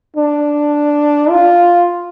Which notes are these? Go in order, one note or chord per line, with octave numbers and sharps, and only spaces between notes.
D4
F4